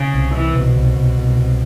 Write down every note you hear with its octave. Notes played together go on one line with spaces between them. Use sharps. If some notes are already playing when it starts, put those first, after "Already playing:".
Already playing: C#3
C2
C2 E3
C2
B2
C2
C2
C2
C2